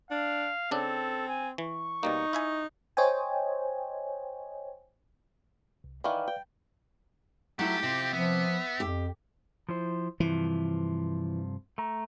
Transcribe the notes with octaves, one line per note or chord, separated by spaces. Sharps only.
D4 F5
C#3 C4 D4 A4
G#5
E3 C#6
B2 G3 A#3 D#4
E4 E5 G#5
C5 C#5 D#5 G5 G#5
C2
D#3 E3 B4 D5 F5
G5
F#3 A3 E4 G4
C3 C4 F4
F3 B3 E5
F2 G4
F3 E4 C5
G2 C3 E3 F3
A3 A#5